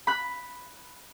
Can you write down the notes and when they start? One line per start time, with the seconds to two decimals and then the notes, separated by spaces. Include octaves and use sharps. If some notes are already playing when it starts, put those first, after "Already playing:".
0.07 B5 F#6